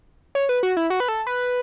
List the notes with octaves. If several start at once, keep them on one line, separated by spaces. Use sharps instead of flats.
C#5
B4
F#4
E4
F#4
B4
A4
B4